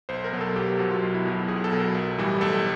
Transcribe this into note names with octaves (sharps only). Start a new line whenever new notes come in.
B1 C5
A#4
B2 F#3
A4
B1 G4
B2 F#3 F#4
F4
B1 F4
E4
B2 F#3 F4
B1 G#4
A4
B2 F#3
A#4
B1
A2 E3 G3
B1 A4